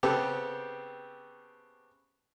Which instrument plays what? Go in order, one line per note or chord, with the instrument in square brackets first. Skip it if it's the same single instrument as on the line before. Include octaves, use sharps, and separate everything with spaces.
[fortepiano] C#3 B3 C4 G4 A4